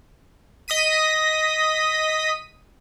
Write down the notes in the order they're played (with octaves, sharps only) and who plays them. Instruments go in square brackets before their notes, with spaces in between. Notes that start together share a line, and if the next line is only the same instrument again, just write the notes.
[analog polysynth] D#5 D#6 B6 D#7